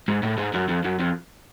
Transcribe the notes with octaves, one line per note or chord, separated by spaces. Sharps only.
G#2
A2
G#2
F#2
F2
F#2
F2